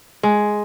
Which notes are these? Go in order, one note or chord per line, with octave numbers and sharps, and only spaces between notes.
G#3